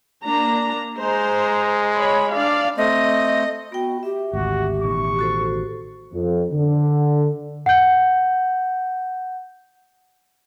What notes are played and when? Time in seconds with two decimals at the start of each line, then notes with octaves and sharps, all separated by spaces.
0.23 A#3 D4 A#5
0.98 G#3 C5 A#5
1.98 C#5 B5
2.32 D4 D5 F5
2.78 A3 C4 D#5
3.72 B3 F#4 G5
4.03 G4 E5
4.33 G#1 D2 F#4
4.83 A1 B2 D#3 C#6
5.19 F#4 A4 C5
6.13 F2
6.53 D3
7.66 F#5 G6